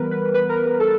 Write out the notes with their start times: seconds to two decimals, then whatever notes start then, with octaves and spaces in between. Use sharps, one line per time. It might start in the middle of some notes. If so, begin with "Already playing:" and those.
Already playing: E3 G3 B3 A#4 B4
0.11 B4
0.34 B4
0.49 A#4
0.65 A#4
0.80 A4